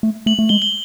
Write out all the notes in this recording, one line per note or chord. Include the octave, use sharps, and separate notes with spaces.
A3
A3 F#7
A3
G#3 G7
G7